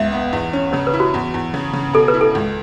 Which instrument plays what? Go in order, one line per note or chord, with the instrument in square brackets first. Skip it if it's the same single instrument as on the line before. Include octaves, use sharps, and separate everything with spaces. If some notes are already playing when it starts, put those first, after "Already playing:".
Already playing: [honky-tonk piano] C#2 B3 [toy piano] E5
[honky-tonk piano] B3
E2
C#4
[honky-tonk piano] C#3 [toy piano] C#5
[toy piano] B4
[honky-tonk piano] E4
[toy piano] F#4
[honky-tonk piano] E2
E2
C#3
C#3
[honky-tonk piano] B2 [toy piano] A4
[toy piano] B4
[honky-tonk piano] E4
[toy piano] A4
[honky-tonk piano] C#2